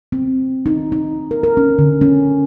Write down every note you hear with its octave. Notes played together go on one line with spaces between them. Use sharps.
C4
D#4
D#4
A#4
A#4
C#4
D3
C#4